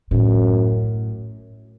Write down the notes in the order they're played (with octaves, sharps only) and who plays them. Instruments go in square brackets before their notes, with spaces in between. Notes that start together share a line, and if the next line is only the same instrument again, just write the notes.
[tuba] F#2 [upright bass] A2